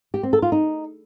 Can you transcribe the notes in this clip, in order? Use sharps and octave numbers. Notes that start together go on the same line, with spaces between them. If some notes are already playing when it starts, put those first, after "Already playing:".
G4
C4
A4
F4
D#4